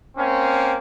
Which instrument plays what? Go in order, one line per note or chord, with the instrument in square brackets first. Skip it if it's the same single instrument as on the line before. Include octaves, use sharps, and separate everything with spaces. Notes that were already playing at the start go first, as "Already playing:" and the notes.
[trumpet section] A#3 C4 C#4